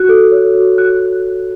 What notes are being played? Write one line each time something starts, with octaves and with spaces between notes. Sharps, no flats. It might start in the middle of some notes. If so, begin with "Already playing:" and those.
Already playing: F#4 F#6
A4
C#5
F#4
F#4 F#6